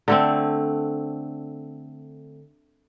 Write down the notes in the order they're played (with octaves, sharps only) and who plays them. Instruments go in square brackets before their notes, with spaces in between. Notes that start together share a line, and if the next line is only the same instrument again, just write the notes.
[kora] D3 A3 C4